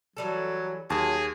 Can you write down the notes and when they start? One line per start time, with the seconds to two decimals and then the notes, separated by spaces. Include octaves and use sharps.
0.17 E3 F#3 G3 A4
0.90 D#2 F#3 G#4 A5